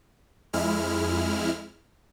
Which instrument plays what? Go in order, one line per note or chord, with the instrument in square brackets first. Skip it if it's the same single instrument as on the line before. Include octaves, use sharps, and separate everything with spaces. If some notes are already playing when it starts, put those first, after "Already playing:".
[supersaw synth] F2 G#3 E4 F6